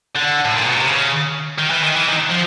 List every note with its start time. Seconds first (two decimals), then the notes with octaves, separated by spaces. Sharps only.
0.16 D3
0.45 A2
0.56 A#2
0.66 B2
0.76 C3
0.87 C#3
1.59 D#3
1.70 E3
1.84 D#3
1.96 E3
2.08 D#3
2.30 F3